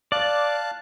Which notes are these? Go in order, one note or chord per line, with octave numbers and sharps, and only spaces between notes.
D5 F5 A5 F#6